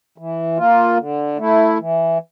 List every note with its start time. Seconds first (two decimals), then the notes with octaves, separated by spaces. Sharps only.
0.18 E3
0.57 A#3 F4
0.97 D3
1.38 A3 E4
1.78 E3